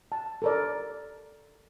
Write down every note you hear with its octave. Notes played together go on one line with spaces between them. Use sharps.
A5
A4 A#4 D5